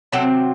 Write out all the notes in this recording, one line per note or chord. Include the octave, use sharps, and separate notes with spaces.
C3 F#3 C4 A4 C5